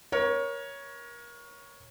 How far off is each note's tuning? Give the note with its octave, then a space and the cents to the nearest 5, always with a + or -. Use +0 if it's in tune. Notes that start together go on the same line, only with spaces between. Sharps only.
A#4 +30 C#5 +0